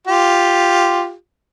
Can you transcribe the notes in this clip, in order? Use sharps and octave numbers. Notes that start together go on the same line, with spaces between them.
F4 G4